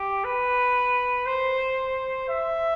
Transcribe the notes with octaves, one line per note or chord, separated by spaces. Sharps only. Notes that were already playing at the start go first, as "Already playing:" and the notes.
Already playing: G4
B4
C5
E5